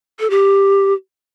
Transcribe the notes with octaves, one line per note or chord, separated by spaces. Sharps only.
A4
G4